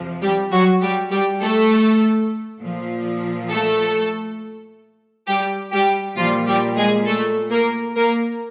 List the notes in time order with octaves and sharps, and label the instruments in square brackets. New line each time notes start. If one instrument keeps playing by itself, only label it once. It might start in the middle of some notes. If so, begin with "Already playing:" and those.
Already playing: [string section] F2 C3 F3
G3 G4
F#3 F#4
G3 G4
G3 G4
A3 A4
A#2 F3
A3 A4
G3 G4
G3 G4
A#2 F3 G3 F4
G3 G4
G#3 G#4
A3 A4
A#3 A#4
A#3 A#4